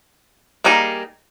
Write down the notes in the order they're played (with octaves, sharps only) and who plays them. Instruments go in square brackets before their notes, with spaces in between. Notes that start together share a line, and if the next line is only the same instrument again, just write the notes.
[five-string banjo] G3 A#3 D#4 G#4